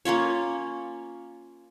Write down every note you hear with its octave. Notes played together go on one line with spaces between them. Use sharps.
A#3 C#4 F4 C#5